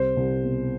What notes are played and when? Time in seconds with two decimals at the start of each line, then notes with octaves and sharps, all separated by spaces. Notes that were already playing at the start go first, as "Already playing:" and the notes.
Already playing: C2 C5
0.17 C2
0.43 B2